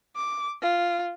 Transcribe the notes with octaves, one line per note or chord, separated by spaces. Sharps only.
D6
F4